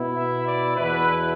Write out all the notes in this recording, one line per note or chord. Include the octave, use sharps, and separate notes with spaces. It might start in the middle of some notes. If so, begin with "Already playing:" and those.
Already playing: B2 B3 E4
E5
D5
E2 B2 B3 E4 B4